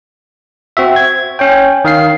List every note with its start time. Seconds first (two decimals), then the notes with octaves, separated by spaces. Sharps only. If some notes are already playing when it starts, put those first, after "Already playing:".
0.77 C4 F#4 E5
0.96 G#6
1.39 C#4 C#5 G5
1.85 D#3 F5 C7